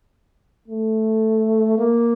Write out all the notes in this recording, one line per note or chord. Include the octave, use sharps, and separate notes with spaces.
A3
A#3